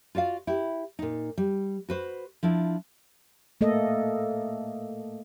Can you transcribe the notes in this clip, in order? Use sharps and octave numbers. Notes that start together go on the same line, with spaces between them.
F4 F#4 D5 F5
E4 G4
A#2 D#4
G3
F#4 B4 C5
F3 D4 E4
A3 A#3 A4 D#5